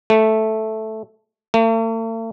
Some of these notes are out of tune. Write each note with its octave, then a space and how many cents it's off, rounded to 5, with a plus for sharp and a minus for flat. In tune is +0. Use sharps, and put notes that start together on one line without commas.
A3 -5
A3 +45